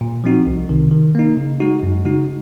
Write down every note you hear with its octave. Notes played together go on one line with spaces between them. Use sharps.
A#2
F3 C4 D#4 F#4
C2
C3 D#3
D#3
A#3 D#4
C#3
G#3 D#4 F#4
F#2
C#3 G#3 D#4 F#4